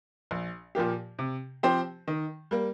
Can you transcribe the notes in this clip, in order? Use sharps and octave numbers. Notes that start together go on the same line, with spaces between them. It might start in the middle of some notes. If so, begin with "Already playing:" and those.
A#1
A#2 F3 A#3 G4
C3
F3 C4 G4 C5
D#3
G3 A#3